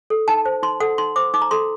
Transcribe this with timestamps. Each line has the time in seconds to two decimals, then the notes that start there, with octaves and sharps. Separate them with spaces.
0.10 A4
0.28 D#4 A5
0.46 C5
0.63 D#4 C6
0.80 A4 F#5
0.98 D#4 C6
1.16 C5 D6
1.34 D#4 D6
1.42 A#5
1.51 A4 C6